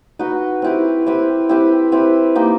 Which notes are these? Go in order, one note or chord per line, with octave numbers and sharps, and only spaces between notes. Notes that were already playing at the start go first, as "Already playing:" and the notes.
D#4 F#4 B4
C4 E4 G4 B4
C4 E4 G4 B4
C4 E4 G4 B4
C4 E4 G4 B4
A#3 D#4 G4